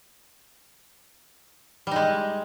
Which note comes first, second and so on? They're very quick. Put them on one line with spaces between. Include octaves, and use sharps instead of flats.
G3 D#4 G#3